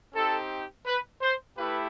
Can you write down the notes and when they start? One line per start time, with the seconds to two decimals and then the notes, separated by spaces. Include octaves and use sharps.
0.14 C4 D#4 G4 A4
0.86 B4
1.22 C5
1.57 A3 E4 G4 B4